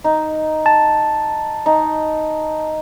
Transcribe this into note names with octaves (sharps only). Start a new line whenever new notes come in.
D#4
A5
D#4